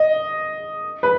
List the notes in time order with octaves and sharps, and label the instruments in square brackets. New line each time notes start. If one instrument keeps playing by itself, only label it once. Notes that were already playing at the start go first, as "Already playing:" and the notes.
Already playing: [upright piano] D#5
B4